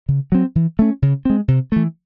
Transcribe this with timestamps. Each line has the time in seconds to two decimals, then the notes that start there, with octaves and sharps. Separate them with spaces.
0.09 C#3
0.32 F#3 C4
0.55 E3
0.79 A3 C#4
1.02 C#3
1.25 G#3 C4
1.48 C3
1.72 E3 A3